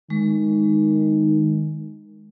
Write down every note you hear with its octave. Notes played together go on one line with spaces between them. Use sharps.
D#3 G#3